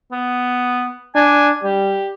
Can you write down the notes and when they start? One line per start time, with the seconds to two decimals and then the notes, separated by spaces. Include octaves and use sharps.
0.12 B3
1.15 D4 G#5
1.63 G3 G4